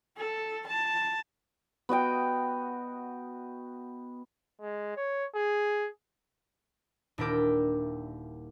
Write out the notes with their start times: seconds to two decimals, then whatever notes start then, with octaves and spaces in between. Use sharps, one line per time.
0.17 A4
0.67 A5
1.89 B3 F#4 D#5 G5
4.61 G#3
4.97 C#5
5.36 G#4
7.18 D#1 D4 E4 A#4 G5 D6